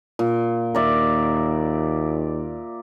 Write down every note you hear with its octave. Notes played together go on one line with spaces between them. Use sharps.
A#2
D#2 A#4 D5 E5